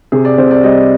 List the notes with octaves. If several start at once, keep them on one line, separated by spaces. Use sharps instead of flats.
C3 G#4
D5
C3 C5
D5
G3 D#5